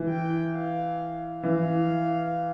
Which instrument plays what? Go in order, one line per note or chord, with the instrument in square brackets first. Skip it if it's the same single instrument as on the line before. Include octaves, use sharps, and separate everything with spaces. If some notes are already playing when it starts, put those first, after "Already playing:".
Already playing: [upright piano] E3
[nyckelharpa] G5
F5
[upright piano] E3 [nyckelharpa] F5